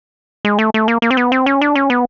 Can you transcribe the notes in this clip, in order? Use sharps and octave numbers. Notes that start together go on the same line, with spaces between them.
G#3
A3
A3
A#3
A#3
C4
B3
C4
C#4
D4
C#4
B3